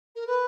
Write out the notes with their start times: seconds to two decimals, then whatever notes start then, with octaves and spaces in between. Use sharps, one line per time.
0.15 A#4
0.26 B4